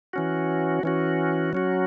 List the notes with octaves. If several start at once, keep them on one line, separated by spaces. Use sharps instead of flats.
E3 C#4 F#4
E3 C#4 F#4
F#3 C#4 F#4